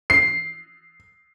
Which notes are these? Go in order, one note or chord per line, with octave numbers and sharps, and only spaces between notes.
C7